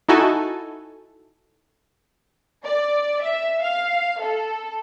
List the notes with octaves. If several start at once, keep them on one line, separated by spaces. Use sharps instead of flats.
D#4 E4 F#4 A4 G#5
D5
E5
F5
A4